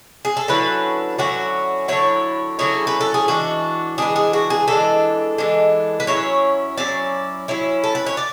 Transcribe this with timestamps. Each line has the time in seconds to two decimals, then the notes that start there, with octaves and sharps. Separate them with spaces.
0.25 G#4
0.37 A4
0.48 D3 F#3 C#4 E4 B4
1.18 D3 F#3 C#4 E4 F#4
1.88 D3 F#3 C#4 E4 C#5
2.59 D3 F#3 C#4 E4 G#4
2.87 B4
3.01 A4
3.14 G#4
3.28 E3 G#3 D4 F#4
3.98 E3 G#3 D4 G#4
4.16 G#4
4.33 F#4
4.50 G#4
4.68 E3 G#3 D4 A4
5.38 E3 G#3 D4
6.00 B4
6.07 F#3 C#4 E4 C#5
6.77 F#3 C#4 E4 D5
7.48 F#3 C#4 E4
7.84 A4
7.95 B4
8.06 C#5
8.17 D5